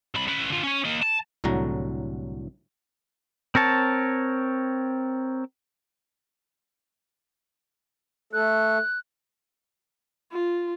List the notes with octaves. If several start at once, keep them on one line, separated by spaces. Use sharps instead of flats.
C2 B5
C#4 B4
D3 F4
C#4 C#5
A#3 D#5
A5
C2 A2 D3 F#3 F#4 A#5
C4 A#4 C#5 A5
A3 A4 F#6
F4